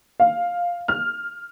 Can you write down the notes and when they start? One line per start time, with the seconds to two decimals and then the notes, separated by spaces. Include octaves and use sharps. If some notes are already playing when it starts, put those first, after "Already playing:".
0.20 F5
0.88 F6